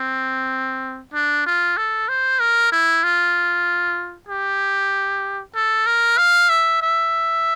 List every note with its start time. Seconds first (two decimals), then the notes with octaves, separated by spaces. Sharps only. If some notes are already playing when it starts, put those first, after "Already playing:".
Already playing: C4
1.14 D4
1.46 F4
1.77 A4
2.08 C5
2.40 A#4
2.72 E4
3.04 F4
4.29 G4
5.55 A4
5.87 A#4
6.18 F5
6.49 E5
6.82 E5